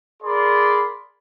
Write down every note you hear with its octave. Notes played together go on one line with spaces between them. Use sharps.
G#4 A#4 D5 B5 C6